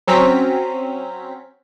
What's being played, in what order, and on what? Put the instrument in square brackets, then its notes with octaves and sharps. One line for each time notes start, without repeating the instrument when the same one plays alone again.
[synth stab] F#3 C4 C#4 A#5 B6